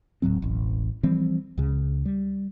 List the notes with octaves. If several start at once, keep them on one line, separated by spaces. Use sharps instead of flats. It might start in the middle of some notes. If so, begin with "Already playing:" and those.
D#1 A2 F#3 C4
E1 A1
E3 F3 G3 C4
C#2 C#3
G3